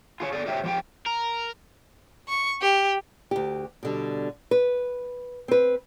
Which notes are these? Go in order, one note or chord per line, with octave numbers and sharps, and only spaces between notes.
F4 G#4 C#5
G#4 A4 D5
G4 A#4 C5 C#5 E5 G5
F3 G4 G5
A#4
C#6
G4
D2 G4
B2 D3 G3
B4
C4 B4